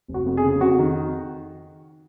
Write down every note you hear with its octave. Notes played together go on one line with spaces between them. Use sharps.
F1
F#4
F2
G#4
C#3
F2 F#4
D#3